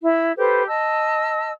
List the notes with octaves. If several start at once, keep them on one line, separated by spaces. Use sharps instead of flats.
E4
G4 A4 B4 C5
D#5 A5 E6